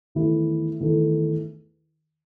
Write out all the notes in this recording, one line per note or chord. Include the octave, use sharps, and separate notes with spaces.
E2 D#3 A3 E4 A4
E2 D#3 A3 E4 A4